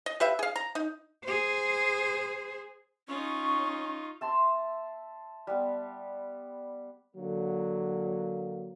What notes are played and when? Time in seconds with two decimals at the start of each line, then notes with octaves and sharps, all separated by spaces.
0.06 D#5
0.20 G4 B4 E5 F5
0.39 G#4 F5
0.56 A#5
0.75 D#4
1.23 G#4 C5
3.08 C#4 D#4 F4 C#6
4.21 E5 A5 C6
5.47 G3 B3
7.16 D3 F#3 A#3